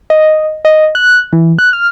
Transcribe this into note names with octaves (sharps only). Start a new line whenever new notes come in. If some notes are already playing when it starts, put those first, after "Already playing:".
D#5
D#5
F#6
E3
F#6
F6